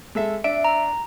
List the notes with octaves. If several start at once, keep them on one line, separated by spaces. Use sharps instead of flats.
G#3 A4 E5
D4 E5 D7
A#5